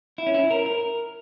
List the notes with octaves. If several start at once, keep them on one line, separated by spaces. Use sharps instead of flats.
E4
C#4
E4
A#4
A#4